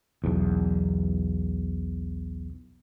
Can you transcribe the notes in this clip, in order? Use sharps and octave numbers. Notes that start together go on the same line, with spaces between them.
B1 E2